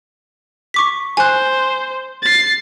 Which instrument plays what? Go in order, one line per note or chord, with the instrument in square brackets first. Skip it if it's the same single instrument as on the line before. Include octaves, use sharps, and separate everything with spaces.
[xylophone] C#6 D6 B6
[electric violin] C5 [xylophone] G#5 F#6
[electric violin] A6 C7